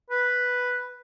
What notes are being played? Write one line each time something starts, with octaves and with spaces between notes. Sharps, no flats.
B4